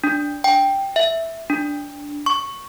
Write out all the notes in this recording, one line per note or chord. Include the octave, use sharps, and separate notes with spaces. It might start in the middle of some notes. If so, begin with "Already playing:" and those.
D4
G5
E5
D4
C#6